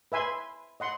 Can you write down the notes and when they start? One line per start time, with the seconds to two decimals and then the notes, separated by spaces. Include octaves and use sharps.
0.12 B4 E5 G#5 C6
0.80 D#5 F#5 C6